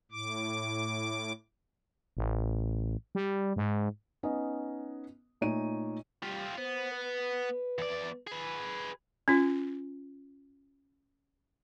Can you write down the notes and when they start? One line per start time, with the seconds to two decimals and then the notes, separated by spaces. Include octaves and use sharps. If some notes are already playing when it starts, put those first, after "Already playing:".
0.11 A2 D6
2.17 A1
3.15 G3
3.56 G#2
4.23 B3 C#4 D#4 D#5
5.41 A#2 A3 D#4 C#5 D#7
6.23 G3 F4 G4
6.58 B3 C5
6.92 B4
7.78 E2 D5
8.27 G#4 B4
9.28 C#4 F4